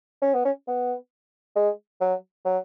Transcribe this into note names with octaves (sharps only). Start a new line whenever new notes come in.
C#4
B3
C#4
B3
G#3
F#3
F#3